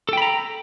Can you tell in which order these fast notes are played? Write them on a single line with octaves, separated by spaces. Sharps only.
A4 G5 B5 A#5